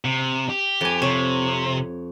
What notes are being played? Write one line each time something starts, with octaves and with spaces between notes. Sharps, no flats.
C3
G4
F2 G#5
C3 C#5